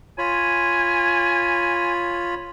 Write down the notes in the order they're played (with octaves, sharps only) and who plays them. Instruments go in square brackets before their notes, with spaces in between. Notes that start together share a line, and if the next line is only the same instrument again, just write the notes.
[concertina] F4 C#5 B5 [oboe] G#5